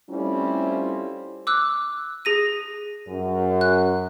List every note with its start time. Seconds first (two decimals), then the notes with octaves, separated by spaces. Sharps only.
0.10 G3 A3 C4 C#4 E4 F4
1.47 D6 E6 F#6
2.25 G#4 A#6 D#7
3.08 F#2
3.61 F#6